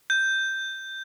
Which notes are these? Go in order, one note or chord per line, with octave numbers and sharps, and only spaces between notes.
G6